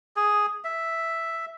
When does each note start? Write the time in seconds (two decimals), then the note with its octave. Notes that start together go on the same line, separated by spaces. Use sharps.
0.16 G#4
0.64 E5